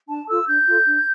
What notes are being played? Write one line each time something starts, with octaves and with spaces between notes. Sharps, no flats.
D4 A5
F4 A4 E6
D4 G6
F4 A4
D4